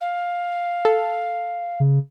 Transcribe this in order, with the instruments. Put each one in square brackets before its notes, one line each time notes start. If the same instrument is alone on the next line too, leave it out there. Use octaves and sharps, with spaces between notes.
[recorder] F5
[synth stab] A4
[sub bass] C#3